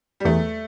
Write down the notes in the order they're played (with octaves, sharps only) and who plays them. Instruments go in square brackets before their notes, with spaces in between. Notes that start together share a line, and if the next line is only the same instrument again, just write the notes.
[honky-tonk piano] G3
[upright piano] E2 [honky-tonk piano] A3